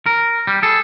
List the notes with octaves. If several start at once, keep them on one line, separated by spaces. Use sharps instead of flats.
A#4
G3
G#4 A4